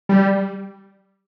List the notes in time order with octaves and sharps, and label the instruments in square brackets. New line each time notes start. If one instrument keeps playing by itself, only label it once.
[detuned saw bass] G3